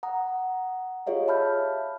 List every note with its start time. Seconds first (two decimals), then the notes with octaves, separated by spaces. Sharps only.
0.03 F#5 A#5 D#6
1.06 F4 G4 G#4 C#5 D#5 F5
1.28 E5 A5 B5 F6 G6